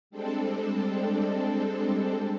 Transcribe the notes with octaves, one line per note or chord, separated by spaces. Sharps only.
G3 G#3 C4 D4 A4